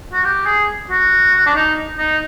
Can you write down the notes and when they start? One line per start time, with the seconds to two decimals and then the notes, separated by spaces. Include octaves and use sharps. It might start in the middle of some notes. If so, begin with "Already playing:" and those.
0.13 F#4
0.25 G4
0.46 G#4
0.90 F#4
1.46 D4
1.55 D#4
1.98 D#4